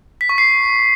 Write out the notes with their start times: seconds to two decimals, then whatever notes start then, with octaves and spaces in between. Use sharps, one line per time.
0.21 B6
0.29 C#6
0.38 C7